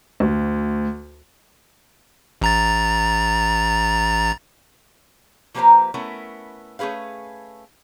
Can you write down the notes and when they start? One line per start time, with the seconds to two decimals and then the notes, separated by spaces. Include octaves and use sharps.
0.20 D2
2.42 A1 A#5 A6
5.54 F3 A#3 G4 B4 C5 A#5
5.94 A3 B3 C#4 E4 A#4
6.79 A3 C#4 G#4 B4 F5